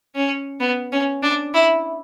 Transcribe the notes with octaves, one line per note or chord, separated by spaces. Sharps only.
C#4
B3
C#4
D4
E4